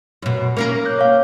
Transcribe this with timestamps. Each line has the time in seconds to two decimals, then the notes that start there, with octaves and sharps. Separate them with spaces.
0.22 F#2 B2
0.57 A#3 C#4 A#4
0.85 D6 F#6 G6
0.99 C#5 F5